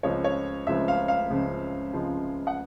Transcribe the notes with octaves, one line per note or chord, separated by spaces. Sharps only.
C#2 C#3 F3 G#3 C4 C#5
C#5
C#2 C#3 F3 G#3 C4 E5
F5
F5
C#2 C#3 F3 G#3 C4
C#2 C#3 F3 G#3 C4
F#5